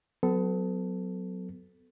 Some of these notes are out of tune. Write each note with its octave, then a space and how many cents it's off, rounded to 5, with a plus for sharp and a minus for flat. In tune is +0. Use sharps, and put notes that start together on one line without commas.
F#3 +0 B3 +35 A4 +0